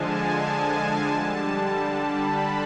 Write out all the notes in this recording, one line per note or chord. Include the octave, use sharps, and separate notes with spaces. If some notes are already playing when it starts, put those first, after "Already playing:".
Already playing: D3 F3 G#3 G#5 A5
A5
D3 G3
B5